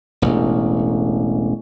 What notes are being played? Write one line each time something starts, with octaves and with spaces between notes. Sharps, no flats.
E1 A1